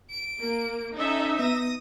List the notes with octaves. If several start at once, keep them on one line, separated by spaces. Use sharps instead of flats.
D7
A#3
C#4 D#4 A4 E5
B3 D#6 A#6